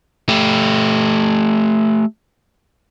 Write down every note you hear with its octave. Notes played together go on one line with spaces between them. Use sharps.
A3 G4